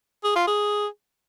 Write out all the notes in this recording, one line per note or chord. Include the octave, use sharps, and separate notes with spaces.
G#4
F4
G#4